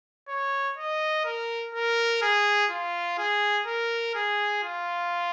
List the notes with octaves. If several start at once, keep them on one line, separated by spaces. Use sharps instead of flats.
C#5
D#5
A#4
A#4
G#4
F4
G#4
A#4
G#4
F4